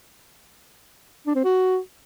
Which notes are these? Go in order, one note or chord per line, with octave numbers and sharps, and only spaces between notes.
D4
C4
F#4